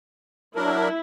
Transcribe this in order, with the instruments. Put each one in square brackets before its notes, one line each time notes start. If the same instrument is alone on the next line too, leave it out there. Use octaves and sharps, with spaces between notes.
[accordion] F#3 D4 A#4 [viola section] E4